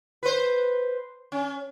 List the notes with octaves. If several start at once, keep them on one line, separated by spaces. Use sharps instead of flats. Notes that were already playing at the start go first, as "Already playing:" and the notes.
B4 C5
C#4